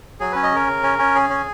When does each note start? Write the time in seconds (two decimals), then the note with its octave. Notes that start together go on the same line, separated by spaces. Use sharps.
0.20 F#3 G#4
0.32 C#4 B4
0.43 D#5
0.51 C#3 A#4
0.67 C#3
0.83 C#4
0.99 C#4
1.15 C#3 G#4
1.30 C#4